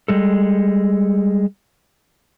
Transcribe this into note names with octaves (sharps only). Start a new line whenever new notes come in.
G3 G#3 A4